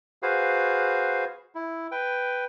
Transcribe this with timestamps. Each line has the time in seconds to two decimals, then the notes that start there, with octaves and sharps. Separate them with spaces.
0.23 F#4 G#4 B4 C5 F5
1.55 E4
1.92 B4 G5